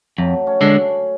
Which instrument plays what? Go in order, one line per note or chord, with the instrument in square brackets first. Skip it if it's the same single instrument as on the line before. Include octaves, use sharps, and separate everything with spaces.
[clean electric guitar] F2 [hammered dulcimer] F#3 A3
[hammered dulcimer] A3 C#4
[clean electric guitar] D3 G#3 D4
[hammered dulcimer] A3 C#4